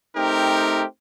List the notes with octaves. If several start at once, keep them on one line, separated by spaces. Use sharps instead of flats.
A3 C4 D#4 G4 A#4